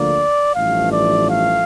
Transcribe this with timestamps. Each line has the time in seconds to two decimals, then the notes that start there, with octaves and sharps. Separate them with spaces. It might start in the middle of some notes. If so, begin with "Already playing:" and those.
Already playing: D2 D3 F3 A#3 D5
0.55 A1 G2 F3 A3 F5
0.92 D5
1.29 F5